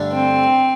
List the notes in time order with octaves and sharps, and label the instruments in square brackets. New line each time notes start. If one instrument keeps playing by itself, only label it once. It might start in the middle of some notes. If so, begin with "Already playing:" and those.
Already playing: [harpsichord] G2 D3 A3 D4
[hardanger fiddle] C4